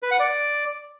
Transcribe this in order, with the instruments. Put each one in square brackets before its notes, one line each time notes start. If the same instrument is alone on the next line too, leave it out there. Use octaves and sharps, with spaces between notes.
[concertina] B4
F#5
D5